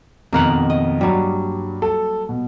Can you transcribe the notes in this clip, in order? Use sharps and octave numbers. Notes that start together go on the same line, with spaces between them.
F2 B2 D#3 A#3 A#4 F#5
D#5
G2 F#3 G3
A4
B2